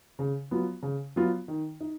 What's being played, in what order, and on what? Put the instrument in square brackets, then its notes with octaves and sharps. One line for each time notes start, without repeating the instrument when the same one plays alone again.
[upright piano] C#3
F#3 B3 F4
C#3
F#3 B3 F4
D#3
D#4